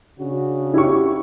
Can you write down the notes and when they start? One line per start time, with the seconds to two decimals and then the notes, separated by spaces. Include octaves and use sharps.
0.20 C#3 D4 F#4
0.74 E4 G4 C#6